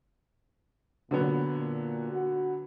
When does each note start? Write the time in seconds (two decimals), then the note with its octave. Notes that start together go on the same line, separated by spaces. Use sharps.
1.11 A#2 D3 F#3 B3
1.55 A#2
2.11 F#4